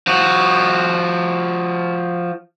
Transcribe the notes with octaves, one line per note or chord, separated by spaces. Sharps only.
F3 F#4